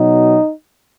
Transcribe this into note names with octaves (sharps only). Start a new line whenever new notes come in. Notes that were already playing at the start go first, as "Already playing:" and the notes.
Already playing: B2 F#3 D#4